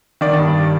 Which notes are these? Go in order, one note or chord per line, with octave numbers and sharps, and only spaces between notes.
D#3 D5
G2